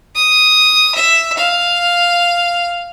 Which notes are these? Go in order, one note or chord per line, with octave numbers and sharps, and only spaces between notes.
D#6
E5
F5